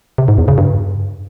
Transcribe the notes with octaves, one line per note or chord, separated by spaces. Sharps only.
C3
G#2
E2
C#3
G2